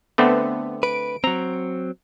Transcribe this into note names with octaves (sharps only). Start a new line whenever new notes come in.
D3 A3 B3 C4
B4 D7
F#3 C4 A#5